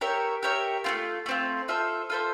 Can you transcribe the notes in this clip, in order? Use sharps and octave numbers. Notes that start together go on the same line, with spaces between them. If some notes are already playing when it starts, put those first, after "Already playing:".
G4 A#4 C#5 E5
G4 A#4 C#5 E5
A3 C4 F4
A3 C4 F4
F4 A4 C5 E5
F4 A4 C5 E5